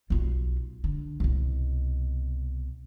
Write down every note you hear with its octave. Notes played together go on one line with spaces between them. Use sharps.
B1 F4
D3
C2 B2